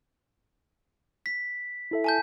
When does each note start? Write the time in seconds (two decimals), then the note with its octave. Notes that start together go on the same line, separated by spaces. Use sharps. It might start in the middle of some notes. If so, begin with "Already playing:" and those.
1.26 B6
1.91 E4 A4 E5
2.04 G#5 A5 G6